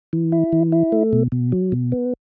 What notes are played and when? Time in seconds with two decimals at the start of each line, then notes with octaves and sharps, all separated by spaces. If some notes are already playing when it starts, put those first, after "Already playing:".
0.13 E3
0.32 E4
0.53 E3
0.72 E4
0.92 A3
1.13 B2
1.32 B2
1.52 F#3
1.72 B2
1.92 B3